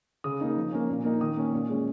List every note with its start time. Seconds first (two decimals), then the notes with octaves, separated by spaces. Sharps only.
0.24 C#3 D#6
0.41 A#3 D#4
0.57 F3
0.72 A#3 C#4
0.89 A#2
1.05 A#3 D#4
1.21 D#3 D#6
1.37 A#3 C#4
1.53 A#2
1.70 G#3 C#4